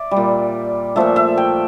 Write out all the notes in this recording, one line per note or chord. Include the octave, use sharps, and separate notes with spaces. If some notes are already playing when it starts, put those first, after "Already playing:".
Already playing: D5 E5
G3
A#2
A#2 F3 A3 E5
E5
G5